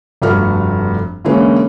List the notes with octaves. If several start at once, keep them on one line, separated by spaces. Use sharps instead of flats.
F1 G2 A3 F#4 F6
D3 E3 G#3 A#3 C#4